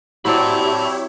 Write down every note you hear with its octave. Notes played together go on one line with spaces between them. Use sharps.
F#3 C4 E4 G4 C#5 D5 A5 B5